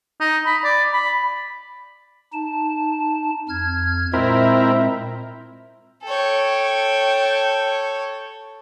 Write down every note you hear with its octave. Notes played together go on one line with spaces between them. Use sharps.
D#4
B5
D5
B5
D#4 A5
F2 F6 G#6
A#2 G#3 C4 E4 A#4 E5
A4 C#5 G5